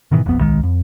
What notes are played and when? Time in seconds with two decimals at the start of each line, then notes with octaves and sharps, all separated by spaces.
0.11 G#2 B2 D#3 E3
0.26 E1 B1 F2 B3
0.39 D1 B1 D#3 G#3
0.63 F2